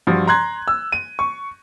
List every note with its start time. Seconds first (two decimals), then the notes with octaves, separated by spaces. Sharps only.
0.07 G2 F3 F#4
0.27 A#5 C6 F#6 G#6
0.68 E6
0.92 D#7
1.19 C#6